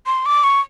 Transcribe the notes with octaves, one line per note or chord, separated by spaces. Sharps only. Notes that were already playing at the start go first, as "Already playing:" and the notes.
C6
D6
C#6